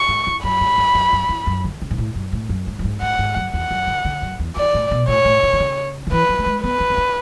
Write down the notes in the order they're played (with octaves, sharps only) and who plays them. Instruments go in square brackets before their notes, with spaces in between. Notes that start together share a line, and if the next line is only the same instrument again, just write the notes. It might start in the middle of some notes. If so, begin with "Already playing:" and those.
Already playing: [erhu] C#6
[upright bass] G#2
E2
[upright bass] F#2 [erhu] B5
[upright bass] G#2
F#2
F#2
F#2
E2
F#2
D3
C#3
G#2
A2
F#2
A2
F#2
G#2
F#2
G#2
[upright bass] G#2 [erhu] F#5
[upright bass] G#2
F#2
[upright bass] E2 [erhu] F#5
[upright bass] F#2
C#3
D3
F#2
E2
[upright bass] E2 [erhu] D5
[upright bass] A2
B2
[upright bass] A2 [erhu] C#5
[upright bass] A2
B2
D3
C#3
D3
[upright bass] E3 [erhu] B4
[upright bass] F#3
A3
G#3
[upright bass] B3 [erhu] B4
[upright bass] C#4
B3
C#4